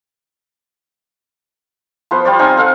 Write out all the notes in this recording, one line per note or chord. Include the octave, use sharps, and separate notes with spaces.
F3 B3 C5
G3 F4 C5 D5
C4 D#4 F5 G#5
A4 F5 F#5